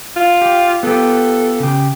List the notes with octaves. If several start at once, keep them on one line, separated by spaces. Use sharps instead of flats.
F4
G4
B3 F4 G4 A4
C#3 G4